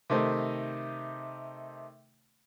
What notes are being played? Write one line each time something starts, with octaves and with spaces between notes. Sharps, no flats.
C3 D#3 A3 D#4 C5